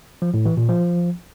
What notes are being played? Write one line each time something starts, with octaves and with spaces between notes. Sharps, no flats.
F3
A2
E3
A#2
F3